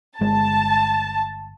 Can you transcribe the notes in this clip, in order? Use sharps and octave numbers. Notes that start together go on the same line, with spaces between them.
G1 G#3 A5